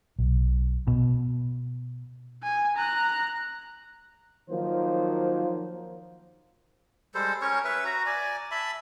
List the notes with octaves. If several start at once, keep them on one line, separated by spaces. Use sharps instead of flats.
B1
B2
G#5
A#5 F#6
D#3 F3 F#3 A#3 C5
G3 G#3 A4 C5
C#4 A#4 C#5 C#6
B4 E5
F#4 A#5
D5 G#5
E5 A5 B5